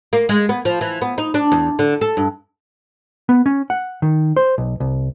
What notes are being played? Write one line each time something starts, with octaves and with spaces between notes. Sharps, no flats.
A#3
G#3
B3
F3
E3
B3
D#4
D4
E2
D3
A4
G2
B3
C#4
F#5
D#3
C5
B1
C2